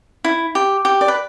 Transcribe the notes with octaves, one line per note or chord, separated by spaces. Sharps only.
E4
G4
G4
D5
B4